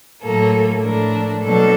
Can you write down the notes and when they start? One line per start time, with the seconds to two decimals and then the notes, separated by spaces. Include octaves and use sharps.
0.22 A2 F#3 A#3 A4
0.82 A2 F3 A3 D4 A#4
1.42 B2 F#3 A#3 D4 A4